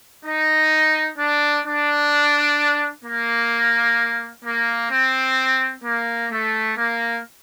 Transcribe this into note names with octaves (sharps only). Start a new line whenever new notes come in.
D#4
D4
D4
A#3
A#3
C4
A#3
A3
A#3